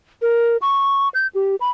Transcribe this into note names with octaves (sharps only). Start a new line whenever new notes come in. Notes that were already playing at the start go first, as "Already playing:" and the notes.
A#4
C#6
G6
G4
B5